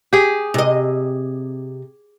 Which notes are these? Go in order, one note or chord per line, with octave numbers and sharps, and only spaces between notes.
G4 G#4
C3 D#5